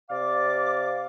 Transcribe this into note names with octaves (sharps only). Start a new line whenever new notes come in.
C3 D5 F5 D6